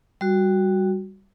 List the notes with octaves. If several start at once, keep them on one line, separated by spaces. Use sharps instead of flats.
G3 F#4